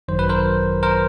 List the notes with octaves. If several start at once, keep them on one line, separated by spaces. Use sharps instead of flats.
G#1 F#2 D#3 F#3 C5
B4
A#4 C5
A#4 C5